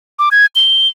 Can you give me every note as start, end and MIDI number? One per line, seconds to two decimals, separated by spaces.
0.19 0.29 86
0.31 0.46 92
0.56 0.88 103